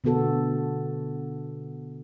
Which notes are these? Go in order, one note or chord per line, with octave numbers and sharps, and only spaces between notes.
B2 D3 B3 F#4 A4